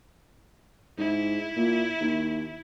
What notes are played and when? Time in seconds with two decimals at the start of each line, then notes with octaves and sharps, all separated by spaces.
0.98 G#2 E4
1.56 A#2
2.01 D#2